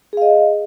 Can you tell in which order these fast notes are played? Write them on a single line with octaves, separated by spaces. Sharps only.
G#4 F5 D#5